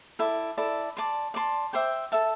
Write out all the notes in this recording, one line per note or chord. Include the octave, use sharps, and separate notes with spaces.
E4 A4 D5
E4 A4 D5
D5 A5 C6
D5 A5 C6
C5 E5 G5 D6
A4 E5 A5